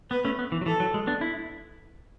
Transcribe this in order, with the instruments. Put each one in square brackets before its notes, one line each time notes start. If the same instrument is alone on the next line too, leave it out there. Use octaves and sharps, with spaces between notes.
[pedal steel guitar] B3 [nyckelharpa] B4
[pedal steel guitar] A3 C#4
B3
E3
F#3
[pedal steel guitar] E3 [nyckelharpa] A4
[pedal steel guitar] F#3
G#3
B3 D4
E4